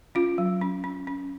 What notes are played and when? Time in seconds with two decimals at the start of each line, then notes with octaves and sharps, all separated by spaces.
0.15 C#4 F4
0.38 F#3
0.61 C#4
0.84 C#4
1.07 C#4